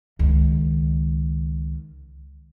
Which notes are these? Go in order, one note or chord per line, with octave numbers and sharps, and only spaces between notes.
C#2 D#3